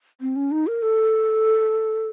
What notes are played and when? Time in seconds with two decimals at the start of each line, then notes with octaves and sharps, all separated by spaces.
0.21 C4
0.36 C#4
0.51 D#4
0.67 A#4
0.82 A4